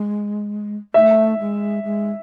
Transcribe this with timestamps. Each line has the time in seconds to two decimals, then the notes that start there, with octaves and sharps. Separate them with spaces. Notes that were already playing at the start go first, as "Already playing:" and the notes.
Already playing: G#3
0.94 A3 E5
1.40 G#3
1.84 G#3